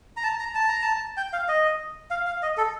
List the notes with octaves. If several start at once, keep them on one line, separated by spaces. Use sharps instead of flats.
A#5
A5
A#5
A5
A#5
A5
G5
F5
D#5
F5
F5
D#5
A4